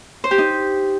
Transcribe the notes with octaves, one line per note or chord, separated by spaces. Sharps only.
C5
G4
D#4